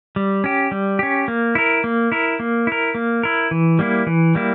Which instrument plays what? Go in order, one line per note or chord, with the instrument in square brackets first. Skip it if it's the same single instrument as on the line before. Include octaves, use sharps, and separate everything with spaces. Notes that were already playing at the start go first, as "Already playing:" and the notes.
[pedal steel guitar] G3
C#4 G4
G3
C#4 G4
A#3
E4 A#4
A#3
E4 A#4
A#3
E4 A#4
A#3
E4 A#4
E3
G3 A#3 E4
E3
G3 A#3 E4